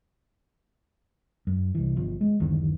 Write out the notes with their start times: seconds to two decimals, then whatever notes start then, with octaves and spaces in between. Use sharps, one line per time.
1.47 F#2
1.75 C2 E3
1.96 G1 F3
2.21 G#3
2.40 F#1 D2 D#3 E3